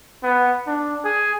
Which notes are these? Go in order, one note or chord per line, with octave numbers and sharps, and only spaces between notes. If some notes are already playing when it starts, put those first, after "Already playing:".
B3
D4
G#4